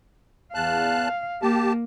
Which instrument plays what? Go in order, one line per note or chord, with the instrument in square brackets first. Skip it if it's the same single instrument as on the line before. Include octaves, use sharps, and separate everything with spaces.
[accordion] E2 A5 F#6 [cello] F5
[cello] A#3 [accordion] G4 A5